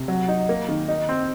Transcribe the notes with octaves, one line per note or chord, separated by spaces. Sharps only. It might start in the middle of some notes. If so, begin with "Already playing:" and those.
Already playing: C3
F#3
D#4
A#3
D#3
D#4
C4